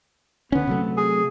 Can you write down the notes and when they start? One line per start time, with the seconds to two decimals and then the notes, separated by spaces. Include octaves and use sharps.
0.52 D3 B3 C#4
0.67 C3 F#3 A3
0.97 G#4